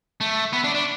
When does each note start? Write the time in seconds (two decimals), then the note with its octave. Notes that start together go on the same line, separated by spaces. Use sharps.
0.21 A3
0.53 B3
0.64 D4
0.75 D4